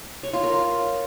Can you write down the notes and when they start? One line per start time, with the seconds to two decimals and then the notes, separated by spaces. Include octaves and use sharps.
0.23 C#5
0.33 F4
0.44 A#4
0.54 F4